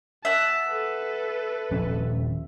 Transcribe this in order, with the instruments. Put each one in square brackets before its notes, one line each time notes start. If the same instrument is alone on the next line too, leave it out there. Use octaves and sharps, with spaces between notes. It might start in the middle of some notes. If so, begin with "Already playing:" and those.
[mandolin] E5 F#5 [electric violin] A5
[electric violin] A4 B4
[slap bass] D#1 F3 C#4